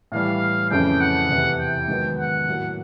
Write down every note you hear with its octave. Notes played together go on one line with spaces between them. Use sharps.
A2 E3 G3 F5
F2 C#3 E3 A3 C#4 G5
F#5
E2 C3 E3
G5
G#2 D#3 F#3 B3
F#5
A2 F#3 A#3